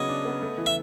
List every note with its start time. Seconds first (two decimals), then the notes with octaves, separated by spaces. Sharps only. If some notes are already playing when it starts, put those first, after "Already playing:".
Already playing: C#3 F#3 B3 C#5 D#5
0.08 D4
0.25 B3
0.42 A3
0.58 E3
0.66 E5